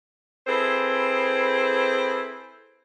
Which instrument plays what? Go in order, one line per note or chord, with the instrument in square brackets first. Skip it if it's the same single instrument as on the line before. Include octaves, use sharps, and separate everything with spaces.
[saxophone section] C4 E4 G#4 A4 B4 C5